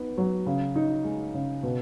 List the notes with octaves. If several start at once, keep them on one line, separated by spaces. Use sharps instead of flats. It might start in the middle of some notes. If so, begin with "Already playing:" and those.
Already playing: B3 D#4
F#3
C#3
D#4
G#3
C#3
B2